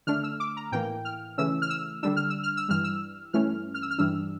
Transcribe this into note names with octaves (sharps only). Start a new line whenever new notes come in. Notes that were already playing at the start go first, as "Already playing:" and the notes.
D3 A3 D4 F6
E6
D6
A#5
A2 E3 A#3 G5
F6
C#3 E3 A3 C#4 E6
F6
E6
D3 G3 D4 E6
F6
E6
F6
E6
G2 E3 G3 F6
E6
G2 E3 A3 C#4 F6
F6
E6
F6
G2 E3 G3 D4 E6